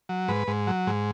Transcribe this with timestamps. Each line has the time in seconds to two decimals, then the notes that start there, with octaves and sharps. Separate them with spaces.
0.09 F#3
0.28 G#2 B4
0.47 G#2
0.67 F#3
0.87 G#2